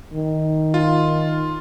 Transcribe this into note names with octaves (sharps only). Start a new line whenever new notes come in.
D#3
F4